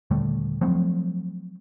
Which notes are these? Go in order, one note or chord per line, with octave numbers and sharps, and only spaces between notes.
D#1 D3 G3 A3
F3 F#3 A3 C4